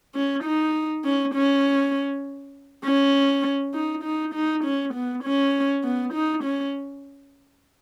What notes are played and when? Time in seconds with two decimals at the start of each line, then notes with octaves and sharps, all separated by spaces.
0.15 C#4
0.44 D#4
1.04 C#4
1.35 C#4
2.85 C#4
3.74 D#4
4.04 D#4
4.34 D#4
4.64 C#4
4.94 B3
5.24 C#4
5.84 B3
6.14 D#4
6.44 C#4